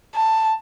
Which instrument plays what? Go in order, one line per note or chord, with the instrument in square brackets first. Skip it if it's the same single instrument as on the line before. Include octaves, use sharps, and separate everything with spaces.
[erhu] A5